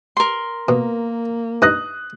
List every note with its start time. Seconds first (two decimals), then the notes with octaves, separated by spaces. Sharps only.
0.17 A#4 C6
0.68 B2 A#3
1.62 G2 D#4 D#5 D#6 F#6